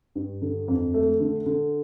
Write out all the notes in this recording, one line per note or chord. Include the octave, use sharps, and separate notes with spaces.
G2
D3
F2
A3
D3
D3